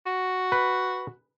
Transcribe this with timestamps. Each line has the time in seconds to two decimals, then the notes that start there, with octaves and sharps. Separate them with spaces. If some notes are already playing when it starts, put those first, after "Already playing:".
0.06 F#4
0.52 B4